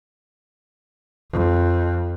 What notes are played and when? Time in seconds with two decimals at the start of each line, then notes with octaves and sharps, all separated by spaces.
1.31 F2